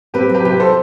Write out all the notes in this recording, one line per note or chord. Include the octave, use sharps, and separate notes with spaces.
C4 G4 B4
F#3 G4 B4
C3 G4 B4
A4 C5